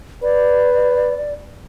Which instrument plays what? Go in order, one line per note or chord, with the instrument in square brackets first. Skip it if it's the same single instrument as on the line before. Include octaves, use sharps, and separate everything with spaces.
[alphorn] B4 [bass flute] D5